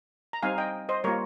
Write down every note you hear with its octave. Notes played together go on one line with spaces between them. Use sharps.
A#5
G3 C4 D#4 F5 G#5
D#5 G5
C5 D#5
G3 A#3 F4 A#4 C#5